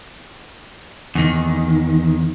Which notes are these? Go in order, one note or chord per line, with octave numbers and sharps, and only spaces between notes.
E2 D#3